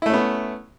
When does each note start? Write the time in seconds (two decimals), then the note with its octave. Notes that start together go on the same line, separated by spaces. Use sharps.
0.02 E4
0.06 A3
0.10 C#4
0.13 B3